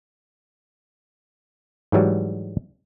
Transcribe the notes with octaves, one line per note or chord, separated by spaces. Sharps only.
G#2 E3 F#3 G3